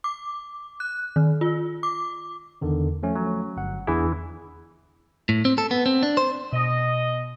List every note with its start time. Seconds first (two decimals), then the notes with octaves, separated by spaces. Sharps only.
0.04 D6
0.80 F#6
1.16 D#3
1.41 F4
1.83 D6
2.62 E2 D3 D#3
3.03 F3 A3 C#4
3.16 F#3
3.57 G1 F#5
3.87 E2 E3 D4 E4 G#4
5.29 A2
5.45 C4
5.58 A4
5.71 B3
5.86 C4
6.03 D4
6.17 C5
6.52 B2 D#5